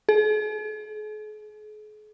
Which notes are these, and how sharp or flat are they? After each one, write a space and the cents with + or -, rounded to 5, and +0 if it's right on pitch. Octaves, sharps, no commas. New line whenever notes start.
G#4 +45